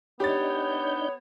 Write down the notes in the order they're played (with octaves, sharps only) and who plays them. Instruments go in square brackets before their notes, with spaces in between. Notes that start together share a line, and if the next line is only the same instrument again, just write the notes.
[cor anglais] B3 [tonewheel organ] D4 D#4 G6 [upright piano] G4 A6 [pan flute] C#5